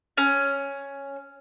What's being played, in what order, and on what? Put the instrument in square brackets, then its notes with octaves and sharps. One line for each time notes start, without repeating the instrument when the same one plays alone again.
[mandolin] C#4